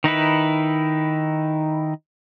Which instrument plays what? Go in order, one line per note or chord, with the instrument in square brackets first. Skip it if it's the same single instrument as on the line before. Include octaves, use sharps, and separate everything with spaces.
[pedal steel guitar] D#3 D#4 E4 B4